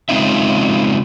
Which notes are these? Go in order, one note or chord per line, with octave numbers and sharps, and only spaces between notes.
C#3 G#3 C4 D#4 F4 E5